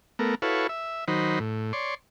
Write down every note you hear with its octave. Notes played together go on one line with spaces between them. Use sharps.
A3 B3 A#4
E4 F#4 A4 B4 C#5 F5
E5
D#3 F#3 D#4 C5 B5
A2
C#5 D5 C6